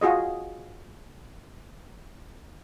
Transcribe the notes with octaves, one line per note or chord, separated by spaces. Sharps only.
F4 F#4 G#4 D#5